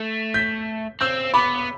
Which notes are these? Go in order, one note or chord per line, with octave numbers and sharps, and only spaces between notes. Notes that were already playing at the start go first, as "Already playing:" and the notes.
Already playing: A3
G6 B6
C4 E6 G6
B3 B5 D6